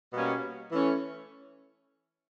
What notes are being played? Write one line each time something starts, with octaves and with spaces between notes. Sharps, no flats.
B2 G3 A#3 C#4
E3 A3 C#4